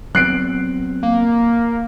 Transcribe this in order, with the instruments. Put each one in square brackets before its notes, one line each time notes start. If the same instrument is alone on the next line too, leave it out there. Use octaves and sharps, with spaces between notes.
[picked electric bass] F#3 B3 C4 [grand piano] F#6 C7 D7
[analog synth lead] A#3